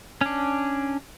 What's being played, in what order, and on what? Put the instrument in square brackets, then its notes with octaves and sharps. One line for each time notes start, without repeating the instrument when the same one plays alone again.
[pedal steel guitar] C#4 D4